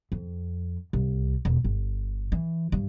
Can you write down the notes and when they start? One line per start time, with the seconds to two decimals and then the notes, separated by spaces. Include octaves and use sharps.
0.12 F2
0.93 C2
1.45 E1
1.64 G1
2.32 E3
2.72 G2